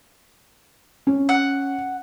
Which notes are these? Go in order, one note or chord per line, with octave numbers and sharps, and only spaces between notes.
C#4
F#5